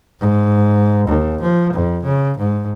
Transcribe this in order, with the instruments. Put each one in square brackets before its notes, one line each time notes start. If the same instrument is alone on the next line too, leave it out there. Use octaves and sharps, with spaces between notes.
[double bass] G#2
D#2
F3
F2
C#3
G#2